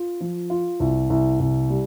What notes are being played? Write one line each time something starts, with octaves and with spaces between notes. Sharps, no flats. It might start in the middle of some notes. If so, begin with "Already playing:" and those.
Already playing: F4
F3
F4
C2
C2
C2
G3